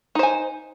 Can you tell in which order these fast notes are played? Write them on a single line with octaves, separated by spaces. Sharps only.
D#4 C5 G#5